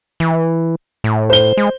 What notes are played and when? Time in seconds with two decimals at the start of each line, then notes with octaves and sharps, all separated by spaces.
0.20 E3
1.04 A2
1.30 C5 G7
1.57 G#3